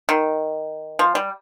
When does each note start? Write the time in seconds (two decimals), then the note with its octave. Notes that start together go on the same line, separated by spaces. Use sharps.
0.09 D#3
0.99 F3
1.15 G3